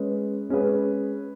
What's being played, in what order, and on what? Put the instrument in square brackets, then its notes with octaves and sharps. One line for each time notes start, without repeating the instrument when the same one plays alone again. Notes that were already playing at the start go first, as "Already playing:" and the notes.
Already playing: [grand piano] G#3 C#4 G#4 B4
G#3 C#4 G#4 B4